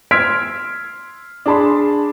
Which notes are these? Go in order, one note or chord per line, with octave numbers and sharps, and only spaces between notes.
C6 E6 F6 G#6 B6 D7
D4 G#4 A5 B5 C6